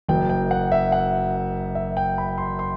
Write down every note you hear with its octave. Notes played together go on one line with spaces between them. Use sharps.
F#1 F#2 F#3 G5
G5
F#5
E5
F#5
E5
G5
B5
C6
C6